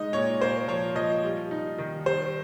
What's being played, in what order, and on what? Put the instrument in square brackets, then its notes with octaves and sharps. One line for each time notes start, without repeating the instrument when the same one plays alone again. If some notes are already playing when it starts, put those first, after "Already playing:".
Already playing: [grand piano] G#3 D#4 D#5
A#2 C#5
A#3 C5
F3 C#5
F3 D#5
G3
D#4
D#3
G3 C5